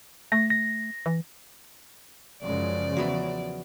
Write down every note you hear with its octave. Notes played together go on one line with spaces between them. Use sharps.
A3 A#6
A#6
E3
F#2 C#3 F3 G#3 D5
E2 F#3 B3 E5